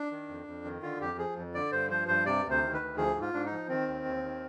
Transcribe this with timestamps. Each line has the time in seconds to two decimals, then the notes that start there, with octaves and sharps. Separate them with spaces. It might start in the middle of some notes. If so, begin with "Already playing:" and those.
Already playing: D4
0.12 D#3
0.29 F2
0.47 F2
0.65 D#3
0.82 D3 F4
1.01 F2 G4
1.18 F3 G#4
1.36 F2
1.55 D3 D5
1.72 G2 C5
1.90 F3 C5
2.08 G2 C5
2.26 C3 D5
2.44 D2
2.50 C5
2.62 D#3
2.74 B4
2.80 D2
2.97 F3 G#4
3.15 G#2
3.21 F4
3.33 G#2 D4
3.46 D#4
3.51 F3
3.69 D#3 C4
3.88 D#2
4.05 D#2
4.24 D#3